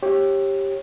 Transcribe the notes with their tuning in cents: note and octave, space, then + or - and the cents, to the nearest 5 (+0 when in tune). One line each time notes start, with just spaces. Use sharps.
G4 +0 C#5 -25